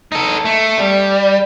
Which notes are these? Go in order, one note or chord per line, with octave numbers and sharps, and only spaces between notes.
D#4 A4
A3
G3